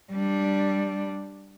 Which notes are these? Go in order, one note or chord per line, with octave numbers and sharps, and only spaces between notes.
G3 D4